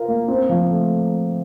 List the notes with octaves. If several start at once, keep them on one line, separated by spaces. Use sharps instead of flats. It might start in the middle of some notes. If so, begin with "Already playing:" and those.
Already playing: F4 A#4
A#3
C4
F3
A3